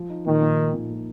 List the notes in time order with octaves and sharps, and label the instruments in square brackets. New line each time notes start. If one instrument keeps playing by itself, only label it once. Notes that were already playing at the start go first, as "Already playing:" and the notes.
Already playing: [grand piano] F3
D#4
[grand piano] A#2 [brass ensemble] D#3
[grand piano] A#2
D#4
A#2
A#2